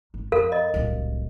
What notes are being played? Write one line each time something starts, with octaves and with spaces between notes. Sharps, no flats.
G#1
F2 A4 A#4 F5
D#5
D1 C2